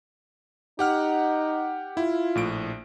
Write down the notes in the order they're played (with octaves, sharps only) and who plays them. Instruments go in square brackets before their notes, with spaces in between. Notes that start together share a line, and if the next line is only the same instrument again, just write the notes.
[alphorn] D#4 [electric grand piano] G4 F#5 F6
[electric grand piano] E4 [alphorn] F4
[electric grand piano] A#1 A2 D7